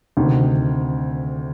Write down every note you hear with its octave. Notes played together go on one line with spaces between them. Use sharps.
D2 C3 D#3